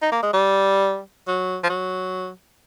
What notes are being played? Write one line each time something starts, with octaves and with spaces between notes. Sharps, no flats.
D#4
A#3
G#3
G3
F#3
F3
F#3